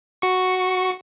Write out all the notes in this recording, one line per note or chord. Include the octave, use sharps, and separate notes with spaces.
F#4 C#6